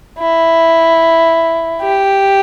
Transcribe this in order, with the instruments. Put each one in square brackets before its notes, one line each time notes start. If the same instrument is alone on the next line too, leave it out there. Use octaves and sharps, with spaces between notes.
[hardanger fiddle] E4
G4